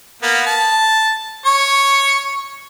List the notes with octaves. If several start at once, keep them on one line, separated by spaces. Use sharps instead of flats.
A#3 B3
A5
C#5 C#6